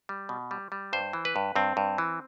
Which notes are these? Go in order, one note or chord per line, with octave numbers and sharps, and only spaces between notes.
G3
B2
G3
G3
G2 C5
E3
B4
G2
G2 C4
G2
E3